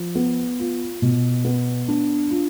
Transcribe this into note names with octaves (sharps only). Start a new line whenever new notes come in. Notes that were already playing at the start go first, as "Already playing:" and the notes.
Already playing: F3
B3
F4
B2
B3
D4
F4